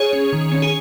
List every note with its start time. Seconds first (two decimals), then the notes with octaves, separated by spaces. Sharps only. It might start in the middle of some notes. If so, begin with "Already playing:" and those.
Already playing: G#4 C#5
0.13 C#4
0.33 D#3
0.52 C#4
0.62 G#4